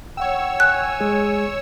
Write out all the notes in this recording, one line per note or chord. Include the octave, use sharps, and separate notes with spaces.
C#5 F#5 G5 E6
G#5 F#6
G#3 G#4